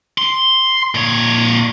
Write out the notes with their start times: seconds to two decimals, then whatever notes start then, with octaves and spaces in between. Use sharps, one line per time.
0.18 C6
0.95 A#2 C#5